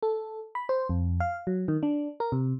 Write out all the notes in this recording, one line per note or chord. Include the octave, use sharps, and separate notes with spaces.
A4
B5
C5
F2
F5
F#3
D#3
D4
A#4
C3